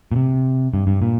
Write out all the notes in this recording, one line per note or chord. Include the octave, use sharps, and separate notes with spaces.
A#2
C3
G2
G2
A#2